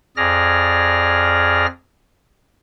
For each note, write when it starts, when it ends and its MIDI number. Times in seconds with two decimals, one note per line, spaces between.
0.17 1.66 41
0.17 1.66 68
0.17 1.66 74
0.17 1.66 89
0.17 1.66 94